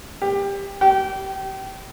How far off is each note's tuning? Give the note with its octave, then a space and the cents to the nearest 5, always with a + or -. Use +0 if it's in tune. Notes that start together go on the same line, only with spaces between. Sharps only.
G4 +20
G4 -30